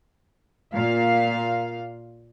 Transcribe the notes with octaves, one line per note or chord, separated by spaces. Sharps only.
A#2 F5